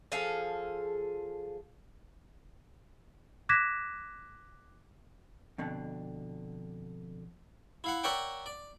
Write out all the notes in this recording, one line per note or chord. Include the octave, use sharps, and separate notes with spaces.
F3 G#4 A4 F5
D6 F#6 G#6 A#6 B6 E7
F2 B2 D3
E4 F5 F#5
A#4 C#5 D5 E5 F#5 G5
D5